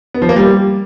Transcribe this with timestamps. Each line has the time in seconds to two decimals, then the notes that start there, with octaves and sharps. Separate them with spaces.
0.14 B3
0.22 F3
0.29 A#3
0.36 G3